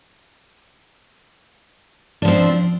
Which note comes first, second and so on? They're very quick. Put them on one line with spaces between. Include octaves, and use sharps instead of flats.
D4 F3 C4